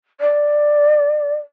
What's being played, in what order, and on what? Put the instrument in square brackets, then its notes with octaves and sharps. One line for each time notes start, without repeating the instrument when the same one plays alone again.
[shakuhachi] D5